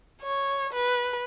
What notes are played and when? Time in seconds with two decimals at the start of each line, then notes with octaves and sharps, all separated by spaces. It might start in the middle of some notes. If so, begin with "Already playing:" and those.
0.22 C#5
0.73 B4